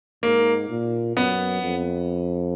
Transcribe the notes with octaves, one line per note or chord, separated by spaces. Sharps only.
G#2 A#3
A#2
F#2 B3
F2